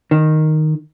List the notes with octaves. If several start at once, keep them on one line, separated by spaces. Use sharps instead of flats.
D#3